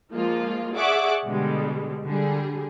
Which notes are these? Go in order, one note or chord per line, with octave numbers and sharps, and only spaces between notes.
F3 G#3 A#3 F4
G#4 D5 E5 F#5 C#6 D6
B2 D3 G3 G#3
D3 G3 G#4